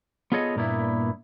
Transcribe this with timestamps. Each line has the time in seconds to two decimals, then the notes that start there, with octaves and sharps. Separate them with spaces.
0.32 B3 F4 G#4 A4 C#5 D#5
0.56 G2 A#2 A#3 B3 E4